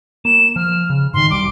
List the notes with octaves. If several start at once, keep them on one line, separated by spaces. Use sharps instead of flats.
A#3 E7
F3 F6
C#3
G#2 D#3 C6
B1 G3 D6